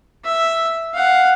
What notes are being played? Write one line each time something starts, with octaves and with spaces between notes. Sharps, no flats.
E5
F5 F#5